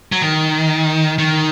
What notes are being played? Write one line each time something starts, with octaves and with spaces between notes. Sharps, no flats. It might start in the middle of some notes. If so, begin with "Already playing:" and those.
F#3
D#3
D#3